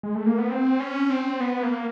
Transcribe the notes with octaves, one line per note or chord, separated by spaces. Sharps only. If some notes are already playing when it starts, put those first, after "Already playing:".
G#3
A3
A#3
B3
C4
C#4
C4
B3
A#3